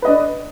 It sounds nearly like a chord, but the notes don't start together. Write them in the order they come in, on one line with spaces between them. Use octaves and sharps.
B4 D#5 D4